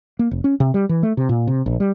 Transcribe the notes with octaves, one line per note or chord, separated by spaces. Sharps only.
A#3
F1
C#4
C3
G3
E3
A3
C3
A#2
C3
A#1
G3